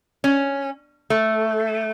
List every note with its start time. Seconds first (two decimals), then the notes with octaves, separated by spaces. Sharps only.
0.24 C#4
1.10 A3